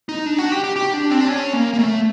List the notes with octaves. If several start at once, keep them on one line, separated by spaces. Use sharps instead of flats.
D#4
D4
F#4
G4
G4
G4
D4
C4
D4
C#4
A#3
A#3
A3